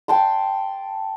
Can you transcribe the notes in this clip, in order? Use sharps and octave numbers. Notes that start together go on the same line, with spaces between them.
G5 A5 C6